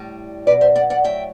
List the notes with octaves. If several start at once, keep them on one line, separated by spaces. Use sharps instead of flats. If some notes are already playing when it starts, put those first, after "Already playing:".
Already playing: A2 G3
B2 F#3 B4 D5
C5 E5
D5 F#5
D5 F#5
A2 F#3 E5 G5